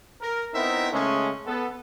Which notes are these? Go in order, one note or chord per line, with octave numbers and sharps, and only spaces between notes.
A#4
B3 C4 D#4 E4 A#4 E5
C#3 G#3 A3 C#4
B3 A4